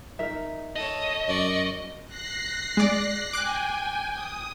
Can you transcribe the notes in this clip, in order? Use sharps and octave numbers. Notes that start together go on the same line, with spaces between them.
D#4 A#4 E5
A4 C#5 D#5
F#2 D5 C#6
F#6 A#6 C7
G#3 D5
G5 G#5 D6 F#6
D#6